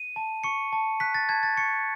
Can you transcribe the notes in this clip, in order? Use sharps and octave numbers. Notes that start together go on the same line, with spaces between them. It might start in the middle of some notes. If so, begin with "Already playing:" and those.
Already playing: D#7
A5
C#6 C#7
A5
F#6 B6
A6
A5 G#6
A6
C#6 C#7